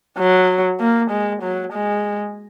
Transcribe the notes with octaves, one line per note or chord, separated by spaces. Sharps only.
F#3
A#3
G#3
F#3
G#3